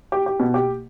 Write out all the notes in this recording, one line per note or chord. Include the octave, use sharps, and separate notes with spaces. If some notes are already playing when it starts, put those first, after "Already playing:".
G4
G4
B2
G4